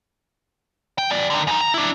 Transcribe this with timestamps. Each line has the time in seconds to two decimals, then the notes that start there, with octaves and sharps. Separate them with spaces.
0.98 G5
1.10 F#2 D5
1.30 D3 D#3
1.47 F#2 D#4
1.61 A#5
1.74 D4 E4